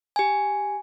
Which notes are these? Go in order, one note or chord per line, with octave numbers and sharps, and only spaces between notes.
G4 G#5